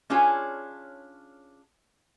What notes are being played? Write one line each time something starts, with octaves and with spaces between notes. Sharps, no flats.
C#4 D4 F4 G#4 C#5